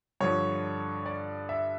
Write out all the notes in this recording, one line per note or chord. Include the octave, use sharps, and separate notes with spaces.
G2 D3 F3 C#5
D5
E5